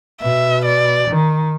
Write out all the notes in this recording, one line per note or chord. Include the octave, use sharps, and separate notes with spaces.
B2 E5
D5
D#3